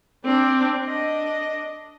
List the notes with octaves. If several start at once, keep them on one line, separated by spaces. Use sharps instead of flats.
C4 D4
D4 D#5